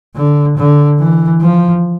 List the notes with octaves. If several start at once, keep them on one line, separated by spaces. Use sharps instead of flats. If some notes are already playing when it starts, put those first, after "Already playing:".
D3
D3
E3
F3